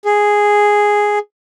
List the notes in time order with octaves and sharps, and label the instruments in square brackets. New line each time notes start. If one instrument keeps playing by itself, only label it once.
[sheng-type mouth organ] G#4